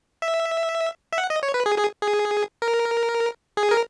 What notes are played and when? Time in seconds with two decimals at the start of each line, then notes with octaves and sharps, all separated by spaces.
0.22 E5
1.13 E5
1.18 F#5
1.30 D#5
1.43 C#5
1.54 B4
1.66 G#4
1.78 G#4
2.02 G#4
2.62 A#4
3.57 G#4
3.71 A#4